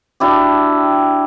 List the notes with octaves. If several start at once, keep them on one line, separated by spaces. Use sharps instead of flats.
D4 E4 F#4 G4